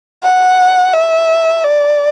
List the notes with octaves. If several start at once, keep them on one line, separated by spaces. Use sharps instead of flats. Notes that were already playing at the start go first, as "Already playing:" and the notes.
F#5
E5
D5